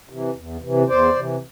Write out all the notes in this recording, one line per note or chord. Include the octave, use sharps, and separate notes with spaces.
C3 E3
E2
C3 E3
E2 C5 D5
C3 E3